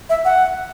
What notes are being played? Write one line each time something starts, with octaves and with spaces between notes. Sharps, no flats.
E5
F#5